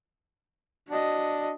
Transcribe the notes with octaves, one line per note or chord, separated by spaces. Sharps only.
D4 F#4 D#5